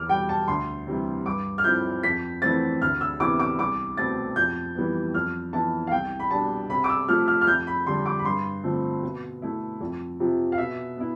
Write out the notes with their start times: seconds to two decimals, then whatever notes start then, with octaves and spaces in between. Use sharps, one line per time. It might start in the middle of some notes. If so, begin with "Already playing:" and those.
Already playing: E2 D6 F6
0.09 B2 G3 G5
0.29 A5
0.48 D2 C6
0.87 C3 E3 G3
1.26 G2 D6
1.58 F6
1.64 F3 C4 E4 G6
2.03 F2 B6
2.42 E3 A3 C4 A6
2.82 D2 F6
3.01 E6
3.20 C3 E3 B3 E4 D6
3.40 D6
3.59 C2 D6
3.97 B2 A3 C4 A6
4.36 F2 G6
4.75 E3 G3 B3
5.14 F2 F6
5.53 E3 B3 E4 A5
5.87 F5
5.91 C2 G5
6.19 B5
6.31 B2 G3 D4 A5
6.69 C3 B5
6.84 D6
6.89 E6
7.08 F3 A3 F6
7.28 F6
7.41 F6
7.47 F2 G6
7.67 B5
7.86 D3 G3 D4 C6
8.06 D6
8.19 B5
8.25 G2 C6
8.63 D3 F3 A3 C4
9.03 B2
9.42 A3 E4
9.81 F2
10.20 C3 F3
10.52 F5
10.58 B2 E5
10.97 B3 E4